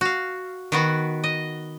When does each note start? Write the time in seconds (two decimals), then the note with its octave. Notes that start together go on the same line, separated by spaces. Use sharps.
0.01 F#4 F5
0.72 D#3 B3 F#4
1.24 D#5